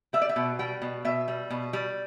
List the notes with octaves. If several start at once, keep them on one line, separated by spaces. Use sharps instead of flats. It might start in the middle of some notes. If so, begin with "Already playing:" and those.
G3 E5
D5
E5
B2
G3 G5
B2
B2 E5
G3
B2
G3